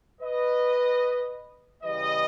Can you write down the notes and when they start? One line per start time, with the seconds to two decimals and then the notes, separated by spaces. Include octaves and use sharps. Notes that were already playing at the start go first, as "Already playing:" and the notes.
0.20 B4 D#5
1.83 C#3 E3 G3 B4 D#5